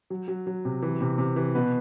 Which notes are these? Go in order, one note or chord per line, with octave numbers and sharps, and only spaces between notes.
F#3
F#3
F#3
C3
E3
C3
C3
E3
B2 B4